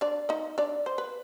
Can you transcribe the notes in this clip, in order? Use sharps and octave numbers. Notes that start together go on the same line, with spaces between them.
D4 D5
D#4 D#5
D4 D5
C5
B4